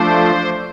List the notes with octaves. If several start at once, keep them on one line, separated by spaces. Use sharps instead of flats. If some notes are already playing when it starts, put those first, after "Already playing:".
Already playing: F3 A3 D4 C5